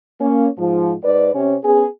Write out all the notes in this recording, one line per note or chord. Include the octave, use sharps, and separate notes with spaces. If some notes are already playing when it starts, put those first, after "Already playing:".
A#3 C#4
G#2 F3
G#2 B4 D5
C3 C#4
B3 C#4 G#4